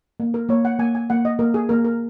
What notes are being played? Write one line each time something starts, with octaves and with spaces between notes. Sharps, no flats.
A#3
A#4
A#3 C#5
F#5
A#3 G#5
G#5
A#3 F#5
D#5
A#3 A#4
G#4
A#3 A#4
A#4